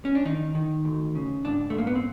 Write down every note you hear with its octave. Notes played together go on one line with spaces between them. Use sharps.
C#4
D4
D#3 D#4
D#3
D2
C#3
G#2 D4
A3
G#2 A#3
B3
C4